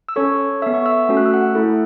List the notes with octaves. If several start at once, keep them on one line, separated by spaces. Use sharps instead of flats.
E6
C#4 A4 C#5 C#6
B3 A4 E5 E6
C#6
E5 E6
A3 C#4 F#4 A4
F#6
E6
F#5 F#6
A3 E4 A4